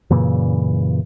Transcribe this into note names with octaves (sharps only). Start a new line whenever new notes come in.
F#2 A#2 C#3 E3